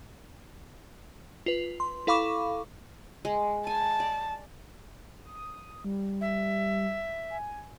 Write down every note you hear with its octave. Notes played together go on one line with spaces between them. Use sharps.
F4 B4
C6
E4 A4 F5 B5 C#6 D6
G#3
G#5 A5
D5
D#6
G3
E5
G#5